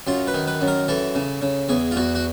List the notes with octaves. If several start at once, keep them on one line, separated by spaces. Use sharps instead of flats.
F#2 F4
B4
D#3
B4
F#2
A#4
E3 A4
C#3
C#3
E2 G#4
F4
E2 F#4
F#4